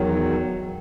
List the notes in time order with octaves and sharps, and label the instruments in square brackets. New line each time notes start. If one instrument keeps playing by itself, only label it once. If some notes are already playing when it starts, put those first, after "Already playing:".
Already playing: [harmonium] E2 D#3 F#3